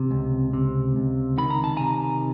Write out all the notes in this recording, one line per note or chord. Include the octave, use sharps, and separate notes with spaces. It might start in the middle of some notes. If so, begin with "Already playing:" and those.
Already playing: C3
C#2
C3
C#2
D#3 B5
A#5
A5
C3 G#5 A#5